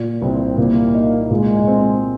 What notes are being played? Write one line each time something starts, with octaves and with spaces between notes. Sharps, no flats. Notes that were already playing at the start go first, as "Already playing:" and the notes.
Already playing: A#2
C2 C4
A#2 A#3
D#4
A#2 G#3
C4